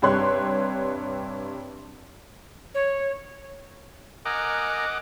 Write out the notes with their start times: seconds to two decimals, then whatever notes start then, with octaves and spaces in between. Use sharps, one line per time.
0.02 G2 C3 G4 C#5 C6 F#6
2.75 C#5
4.26 A#4 D#5 F#5 G#5 A#5 D6